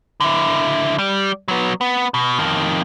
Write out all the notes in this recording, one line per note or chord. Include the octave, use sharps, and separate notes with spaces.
D3 E4
G3
F#3 B3
B3
B2
F2 D#3